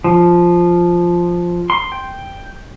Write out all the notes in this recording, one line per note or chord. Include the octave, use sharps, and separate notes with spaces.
F3
C6
G5